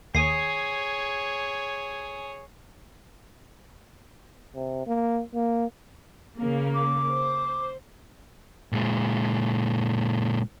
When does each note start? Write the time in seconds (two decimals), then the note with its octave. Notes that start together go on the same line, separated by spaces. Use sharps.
0.15 D#2 G#4 C#5 D#6 C7
4.55 C3
4.87 A#3
5.34 A#3
6.38 C#3 A#3
6.75 D6
7.11 C5
8.72 A#2 G#3